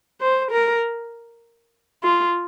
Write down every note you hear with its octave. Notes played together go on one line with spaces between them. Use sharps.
C5
A#4
F4